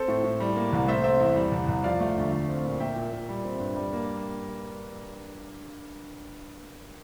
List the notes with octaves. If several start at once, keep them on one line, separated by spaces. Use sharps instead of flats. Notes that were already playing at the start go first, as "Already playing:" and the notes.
Already playing: C4 A4 C5
A2
A2
G3
A#3
C2
A3 C5 E5
C4 C5 E5
E2
G3
C2
C2
F3 D5 F5
A3
D2
A3
C4
A#2
A#3 E5 G5
A#2
A#2
G3
C4
G2
G3
A#3